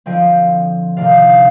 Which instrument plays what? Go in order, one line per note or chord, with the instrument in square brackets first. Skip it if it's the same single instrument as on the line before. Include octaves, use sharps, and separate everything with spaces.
[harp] D3 F3 C4 D#5 G5
C3 D#3 A3 D4 D5 F5
D#5
D5 F5